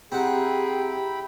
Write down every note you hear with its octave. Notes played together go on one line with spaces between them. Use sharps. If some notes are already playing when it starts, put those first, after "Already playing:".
C4 E4 G4 G#4 F#5 G5 A#5 B5